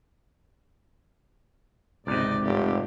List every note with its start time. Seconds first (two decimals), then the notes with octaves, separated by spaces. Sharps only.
2.07 G#1 C#2 C3 D#4 D5
2.44 F1 G4